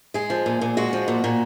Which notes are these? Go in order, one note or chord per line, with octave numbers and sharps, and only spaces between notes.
G#3 G#4
F3
A#2
A#2
G#3 F#4
F3
A#2
A#2